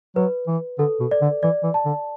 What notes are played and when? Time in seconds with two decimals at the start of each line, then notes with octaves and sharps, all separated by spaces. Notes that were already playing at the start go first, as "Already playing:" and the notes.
0.16 F#3 B4
0.47 E3
0.79 D3 A4
1.00 B2
1.11 D5
1.22 D3
1.43 E3 D5
1.63 E3
1.74 A5
1.85 D3